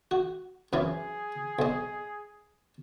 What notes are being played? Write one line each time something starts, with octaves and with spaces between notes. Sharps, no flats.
F#4
F#2 E3 C#4 G#4
B1 D#5